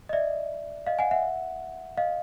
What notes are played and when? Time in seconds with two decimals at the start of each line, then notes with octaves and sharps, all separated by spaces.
0.09 D#5
0.13 D5 E5
0.87 D#5 F5
0.99 F#5 G#5
1.11 E5 F#5
1.97 D#5 F5